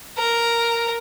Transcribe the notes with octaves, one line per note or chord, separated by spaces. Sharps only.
A#4